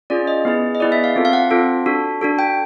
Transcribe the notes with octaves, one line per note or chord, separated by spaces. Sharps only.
C#4 F4 G#4 D5
D#5
B3 E4 G#4
D#5
B3 E4 G#4 D5
E5
F5
C4 F4 A4
F5
F#5
C4 F4 A4
D4 F#4 A4
D4 F#4 A4
G5